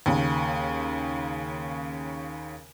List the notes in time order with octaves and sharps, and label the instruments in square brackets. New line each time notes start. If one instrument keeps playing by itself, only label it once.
[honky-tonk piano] D#2 C#3